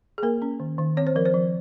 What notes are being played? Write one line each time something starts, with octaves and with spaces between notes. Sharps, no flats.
G#4
A#3 A#4
C#4
D#3
D#3
C4 C#5
C5
F3 A#4
C5
F3